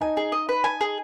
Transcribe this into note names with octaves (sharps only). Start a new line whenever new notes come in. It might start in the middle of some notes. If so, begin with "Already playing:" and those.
D#4 G#5
G#4
D#5
B4
G#5
G#4